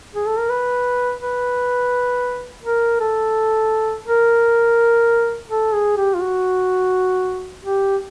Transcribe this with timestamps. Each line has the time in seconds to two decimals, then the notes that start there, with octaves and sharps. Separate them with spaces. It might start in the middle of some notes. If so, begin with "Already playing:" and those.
0.15 G#4
0.27 A4
0.39 A#4
0.50 B4
1.21 B4
2.64 A#4
3.00 A4
4.07 A#4
5.50 A4
5.73 G#4
5.97 G4
6.14 F4
6.21 F#4
7.64 G4